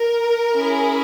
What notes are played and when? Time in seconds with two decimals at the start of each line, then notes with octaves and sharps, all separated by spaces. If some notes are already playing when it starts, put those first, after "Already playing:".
Already playing: A#4
0.54 C#4 E4 G#4